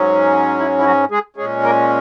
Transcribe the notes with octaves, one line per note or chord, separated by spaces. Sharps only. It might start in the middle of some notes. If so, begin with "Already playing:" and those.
Already playing: G#2 F#3 C#4
E4
E4
F#3 F#4
G#3 G#4
A#2 G#3 C#4 G#4
A#3 A#4